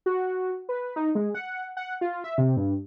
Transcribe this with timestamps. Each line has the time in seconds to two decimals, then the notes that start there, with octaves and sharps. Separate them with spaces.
0.06 F#4
0.69 B4
0.96 D#4
1.15 G#3
1.35 F#5
1.77 F#5
2.01 F4
2.24 E5
2.38 C3
2.57 G2